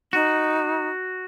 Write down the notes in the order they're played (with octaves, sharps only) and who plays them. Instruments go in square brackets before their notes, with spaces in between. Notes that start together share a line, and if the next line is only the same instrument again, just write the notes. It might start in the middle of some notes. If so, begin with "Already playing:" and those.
[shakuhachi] D#4 [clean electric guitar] F#4